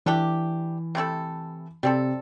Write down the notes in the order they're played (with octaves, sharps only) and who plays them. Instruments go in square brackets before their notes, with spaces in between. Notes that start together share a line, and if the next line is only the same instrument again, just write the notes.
[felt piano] E3 [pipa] A3 D4 G4
[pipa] C3 A3 E4 A4
[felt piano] C3 [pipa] G3 C4 A4